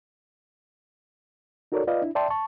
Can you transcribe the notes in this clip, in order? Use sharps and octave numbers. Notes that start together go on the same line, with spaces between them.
D#4 F#4 A4 A#4 C#5 D5
F4 B4 D5 D#5 F5
D4 E4
D5 E5 G5 A5 C6
A5 C#6